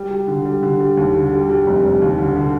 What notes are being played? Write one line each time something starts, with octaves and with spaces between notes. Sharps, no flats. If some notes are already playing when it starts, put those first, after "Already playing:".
Already playing: G3
G3
D3
G3
D3
G3
D#2
D3
G3
G3
F1
F1
D#2
D3
D3